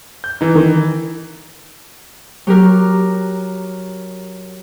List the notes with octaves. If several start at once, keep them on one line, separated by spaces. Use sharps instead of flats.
G6
E3 D#4
D#3
F#3 G4 A#4